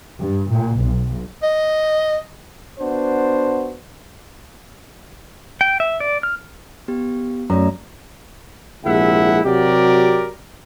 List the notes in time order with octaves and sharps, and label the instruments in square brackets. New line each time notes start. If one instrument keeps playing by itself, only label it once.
[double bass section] G2
A#2
B1
[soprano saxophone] D#5
[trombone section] B3 D4 F#4 C5
[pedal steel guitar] G5
E5
D5
F6
[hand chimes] B3 G4
[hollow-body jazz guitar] F#2 [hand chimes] A3 D5 A#5
[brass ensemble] A#1 C3 G#3 E4 E5 F#5
C3 F#3 F#4 G4 A#4 D5